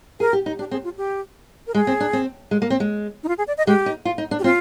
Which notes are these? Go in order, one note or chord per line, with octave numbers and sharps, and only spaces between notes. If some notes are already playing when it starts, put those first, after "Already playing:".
G#4 A#4
G4
D#4
D4 G4
C4 G#4
F4
G4
A#4
G#3 G#4
C4
D4
C4
G#3
A#3
C4
G#3
D#4
F4
G#4
D5
D#5
G#3 G4
D#4
F4
D#4
D4
G4
C4 F4